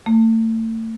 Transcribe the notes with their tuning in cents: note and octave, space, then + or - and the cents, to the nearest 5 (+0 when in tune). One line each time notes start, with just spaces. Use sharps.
A3 +35